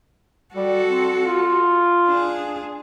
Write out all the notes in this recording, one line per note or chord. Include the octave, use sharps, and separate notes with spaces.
G3 F#4 A4
C4
F4
D4 G#4